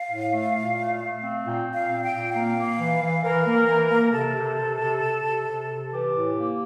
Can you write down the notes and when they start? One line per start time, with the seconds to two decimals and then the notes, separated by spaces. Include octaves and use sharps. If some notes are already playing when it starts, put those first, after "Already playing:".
Already playing: F5
0.11 A2
0.33 A3
0.56 A#2
0.79 A3
1.00 A3
1.23 C4
1.45 A#2 G5
1.67 A#2
1.75 F5
1.89 C4
2.05 G5
2.12 A#2
2.34 A#3 F5
2.57 A#3
2.78 E3
3.01 E3
3.24 E3 A#4
3.45 A#3
3.68 E3
3.90 A#3
4.13 C3 A4
4.36 C3
4.58 C3
4.80 C3
5.02 C3
5.24 C3
5.46 C3
5.70 C3
5.92 E3 G4
6.14 A2
6.36 A#3